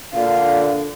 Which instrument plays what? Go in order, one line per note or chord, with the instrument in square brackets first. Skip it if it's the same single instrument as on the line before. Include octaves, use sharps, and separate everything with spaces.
[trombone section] A#2 D3 [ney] F5